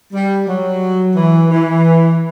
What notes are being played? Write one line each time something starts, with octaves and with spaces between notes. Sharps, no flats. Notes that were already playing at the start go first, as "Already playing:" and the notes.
G3
F#3
E3
E3